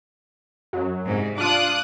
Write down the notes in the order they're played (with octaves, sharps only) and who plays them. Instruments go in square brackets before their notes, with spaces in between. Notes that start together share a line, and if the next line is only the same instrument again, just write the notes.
[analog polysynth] F#2 F#3
[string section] C2 G#2
[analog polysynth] D4 F4 [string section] D6 D#6 F#6